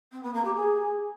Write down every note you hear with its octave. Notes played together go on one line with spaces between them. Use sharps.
C4
B3
A#3
G4
G#4